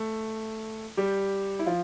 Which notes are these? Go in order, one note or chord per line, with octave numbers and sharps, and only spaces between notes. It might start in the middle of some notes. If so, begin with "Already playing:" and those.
Already playing: A3
G3 G4
E4
F3 F4